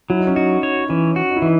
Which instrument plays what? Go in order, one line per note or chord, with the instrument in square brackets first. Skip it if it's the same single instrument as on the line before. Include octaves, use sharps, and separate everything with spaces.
[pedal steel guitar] F#3 [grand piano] E4
[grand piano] D#4
C#4
[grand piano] D#4 [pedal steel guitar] F#4
[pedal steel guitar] C#5
[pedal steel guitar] E3 [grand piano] C#4
[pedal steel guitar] F#4
[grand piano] D#4
E4
[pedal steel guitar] E3 [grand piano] D#4